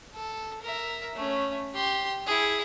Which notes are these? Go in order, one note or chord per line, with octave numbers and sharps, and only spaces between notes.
A4
A#4 E5
A3 C#4
G4 C6
E4 G#4